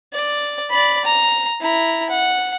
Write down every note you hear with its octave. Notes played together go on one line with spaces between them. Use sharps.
D5
D5 B5
A#5
E4 A#5
F#5